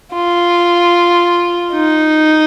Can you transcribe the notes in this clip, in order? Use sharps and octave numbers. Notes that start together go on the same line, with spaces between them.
F4
D#4